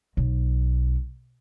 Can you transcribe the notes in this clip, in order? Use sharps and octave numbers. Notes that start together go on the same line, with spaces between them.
B1